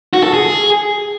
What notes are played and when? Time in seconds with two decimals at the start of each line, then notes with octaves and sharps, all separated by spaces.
0.13 F#4
0.23 A4
0.33 G#4